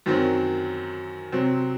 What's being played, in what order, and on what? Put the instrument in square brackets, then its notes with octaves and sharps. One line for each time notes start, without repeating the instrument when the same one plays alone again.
[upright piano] F#2 D#3 F#3 C4
C3 F#3 C4